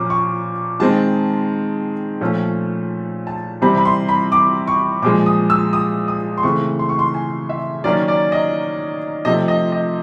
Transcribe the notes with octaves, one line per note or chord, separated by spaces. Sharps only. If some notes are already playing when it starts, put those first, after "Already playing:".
Already playing: A#2 F3 A#3 C#4 D6
C#6
D#3 G#3 C4 A5
A#2 F3 A3 C#4
A5
C3 E3 G3 C4 B5
B5
C6
B5
D6
C#6
A#2 F3 G#3 D6
D#6
E6
D#6
D#6
C6
C#3 E3 A3 C4 C#6
C6
C#6
C6
G#5
E5
D#3 F#3 A#3 C#4 D5
D5
D#5
C3 F3 A3 D#5
D#5
D#5